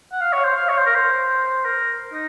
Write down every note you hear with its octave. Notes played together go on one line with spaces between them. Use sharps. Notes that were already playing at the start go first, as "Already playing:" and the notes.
F#5
F5
C#5
C5
F5
C#5
C5
A#4
C5
A#4
D#4